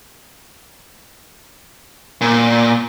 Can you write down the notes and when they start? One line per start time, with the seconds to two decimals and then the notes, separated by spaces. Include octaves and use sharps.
2.21 A#2